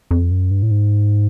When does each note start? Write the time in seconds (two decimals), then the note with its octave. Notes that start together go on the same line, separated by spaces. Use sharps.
0.11 F2
0.31 F#2
0.51 G2
0.63 A2
0.71 G#2